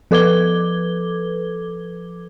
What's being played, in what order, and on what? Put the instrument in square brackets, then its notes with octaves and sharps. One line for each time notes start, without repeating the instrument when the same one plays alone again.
[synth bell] F3 A4 B4 D6 G#6 G7